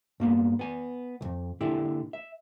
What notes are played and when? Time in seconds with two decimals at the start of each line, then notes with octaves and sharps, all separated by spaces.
0.20 G2 A#3 B3
0.59 B3 G#5
1.21 B1 F2
1.61 A#2 D3 E4 G4
2.13 E5